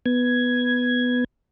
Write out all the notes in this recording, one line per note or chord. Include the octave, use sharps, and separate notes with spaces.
B3 G#6